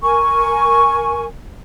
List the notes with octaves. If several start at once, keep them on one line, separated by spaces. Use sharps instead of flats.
A#4 G#5 C#6